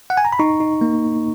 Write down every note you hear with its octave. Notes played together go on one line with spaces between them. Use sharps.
F#5
G#5
A#5
B5
D#4 A#5 C#6
D#4
A#3